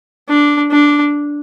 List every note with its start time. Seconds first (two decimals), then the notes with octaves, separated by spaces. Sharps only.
0.29 D4
0.71 D4